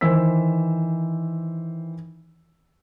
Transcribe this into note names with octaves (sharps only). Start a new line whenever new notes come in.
D#3 E3 C5 E6 B6